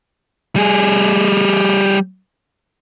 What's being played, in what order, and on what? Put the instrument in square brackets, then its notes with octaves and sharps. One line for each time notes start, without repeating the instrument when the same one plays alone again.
[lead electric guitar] G3 G#4